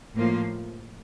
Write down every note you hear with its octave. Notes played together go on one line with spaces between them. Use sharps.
A2 F3 A#3 F4